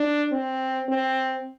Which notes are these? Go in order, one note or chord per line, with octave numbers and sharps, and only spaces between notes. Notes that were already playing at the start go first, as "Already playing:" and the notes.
Already playing: D4
C4
C4